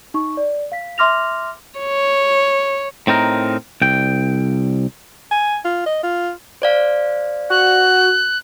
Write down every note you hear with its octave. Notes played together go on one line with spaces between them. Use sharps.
D#4 C#6
D5
F5 B6
E5 C6 D6 F6 A#6 F7
C#5
A2 C4 D#4 A#4
C2 G5
G#5
F4
D#5
F4
C5 D5 F5
F#4 F#6